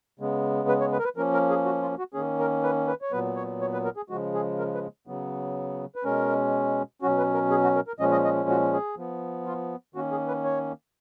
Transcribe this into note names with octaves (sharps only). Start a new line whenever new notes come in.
C#3 G#3 B3
B4
C#5
B4
A#4
B4
F3 A#3 C#4 A#4
A#4
G#4
F#4
F4
F#4
D#3 A#3 C#4 G#4
A#4
B4
B4
C#5
A#2 F#3 B3 B4
C#5
C#5
B4
A#4
G#4
C#3 F3 G#3 F#4
G#4
A#4
B4
C#3 F#3 B3
B4
B2 G#3 C#4 A#4
B2 F#3 C#4 F#4
B4
A#4
G#4
F#4
A#4
A#4
A#2 F3 G#3 C#4 D#5
D#5
D#5
F#4
G#4
F3 B3
F4
D#3 A#3 C#4 F#4
G#4
B4
C#5